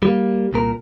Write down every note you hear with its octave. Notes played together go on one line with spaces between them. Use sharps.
G3 A#3
C2 A#2 A#4